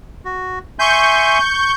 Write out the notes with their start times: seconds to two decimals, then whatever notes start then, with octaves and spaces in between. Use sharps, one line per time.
0.25 F#4
0.79 E5 G#5 C6 C#6 G6